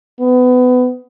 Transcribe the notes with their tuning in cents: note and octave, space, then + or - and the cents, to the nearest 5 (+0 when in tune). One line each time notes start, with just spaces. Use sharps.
B3 +25